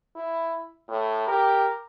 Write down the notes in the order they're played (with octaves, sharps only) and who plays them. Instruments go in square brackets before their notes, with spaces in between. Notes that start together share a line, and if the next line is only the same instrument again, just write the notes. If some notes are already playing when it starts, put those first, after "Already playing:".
[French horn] E4
A2
[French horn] G4 [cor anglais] A#4